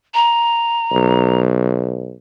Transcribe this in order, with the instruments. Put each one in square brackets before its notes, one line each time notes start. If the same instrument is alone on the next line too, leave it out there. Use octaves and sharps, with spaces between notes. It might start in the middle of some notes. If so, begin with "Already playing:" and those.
[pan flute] A#5
[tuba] B1